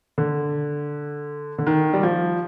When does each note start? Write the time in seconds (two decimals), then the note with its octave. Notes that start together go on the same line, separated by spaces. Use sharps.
0.18 D3
1.58 D3
1.67 D#3
1.94 G3
2.03 F3